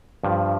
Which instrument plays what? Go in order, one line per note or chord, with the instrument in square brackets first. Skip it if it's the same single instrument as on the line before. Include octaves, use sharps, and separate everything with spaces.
[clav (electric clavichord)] G2 F3